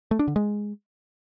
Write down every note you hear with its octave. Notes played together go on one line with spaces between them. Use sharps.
A3
D4
D3
G#3